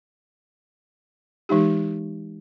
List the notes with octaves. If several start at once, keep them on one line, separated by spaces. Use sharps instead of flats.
E3 G#3 D#4 G4